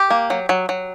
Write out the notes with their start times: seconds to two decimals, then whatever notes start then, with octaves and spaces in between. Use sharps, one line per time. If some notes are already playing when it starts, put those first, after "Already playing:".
Already playing: G4
0.10 A#3
0.30 F#3
0.49 F#3
0.69 F#3